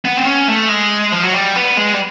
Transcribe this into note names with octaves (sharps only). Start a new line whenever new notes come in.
B3
C4
C#4
A3
G#3
F3
F#3
G3
B3
G#3
G3